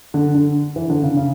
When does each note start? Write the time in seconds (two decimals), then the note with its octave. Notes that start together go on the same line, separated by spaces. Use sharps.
0.14 D3
0.34 D3
0.76 E3
0.90 D3
1.03 C#3
1.17 C#3